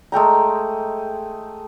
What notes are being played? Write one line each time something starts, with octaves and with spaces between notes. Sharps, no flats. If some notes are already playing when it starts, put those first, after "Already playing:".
G#3 A3 G5 A#5